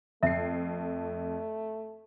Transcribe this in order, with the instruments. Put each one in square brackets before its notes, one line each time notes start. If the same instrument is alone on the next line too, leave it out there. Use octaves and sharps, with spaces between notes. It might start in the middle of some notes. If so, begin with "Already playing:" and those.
[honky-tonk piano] F2 C7 [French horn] A3 [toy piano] E5